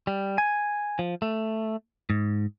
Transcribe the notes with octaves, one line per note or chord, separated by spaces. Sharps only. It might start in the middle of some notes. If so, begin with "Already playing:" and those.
G3
G#5
F3
A3
G#2